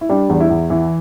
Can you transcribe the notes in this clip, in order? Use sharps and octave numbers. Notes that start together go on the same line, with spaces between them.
E4
G3 D4
E2
E4
E2
E3 E4